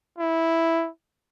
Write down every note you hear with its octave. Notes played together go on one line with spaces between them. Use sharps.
E4